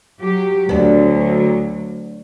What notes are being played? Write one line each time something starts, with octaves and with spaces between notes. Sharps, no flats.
F#3 G4
D2 F#3 B3 D4